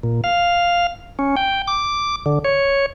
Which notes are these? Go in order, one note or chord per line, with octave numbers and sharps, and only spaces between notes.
A#2
F5
C#4
G5
D6
D3
C#5